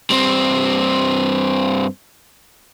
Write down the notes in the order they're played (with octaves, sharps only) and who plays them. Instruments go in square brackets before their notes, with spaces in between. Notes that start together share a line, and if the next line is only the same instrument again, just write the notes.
[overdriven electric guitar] G2 C4